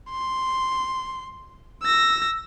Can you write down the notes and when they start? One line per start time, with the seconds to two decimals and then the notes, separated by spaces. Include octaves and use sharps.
0.10 C6
1.83 E6 A#6